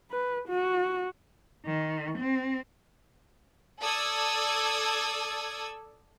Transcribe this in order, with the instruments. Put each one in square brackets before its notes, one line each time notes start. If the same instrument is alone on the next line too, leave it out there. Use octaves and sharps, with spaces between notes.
[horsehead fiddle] B4
F#4
[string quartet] D#3
C4
[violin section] A4 D5 D#6 E6 G#6